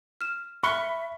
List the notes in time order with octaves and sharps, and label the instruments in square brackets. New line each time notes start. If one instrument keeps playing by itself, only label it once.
[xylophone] F6 E7
[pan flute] E5 [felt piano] B5 [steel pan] C#6 [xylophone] F6 F#6 G7